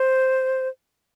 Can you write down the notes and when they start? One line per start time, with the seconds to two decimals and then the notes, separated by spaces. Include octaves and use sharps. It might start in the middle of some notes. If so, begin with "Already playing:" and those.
Already playing: C5